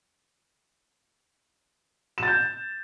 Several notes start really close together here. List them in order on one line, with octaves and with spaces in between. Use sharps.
E7 A6 G6